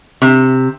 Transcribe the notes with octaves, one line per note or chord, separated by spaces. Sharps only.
C3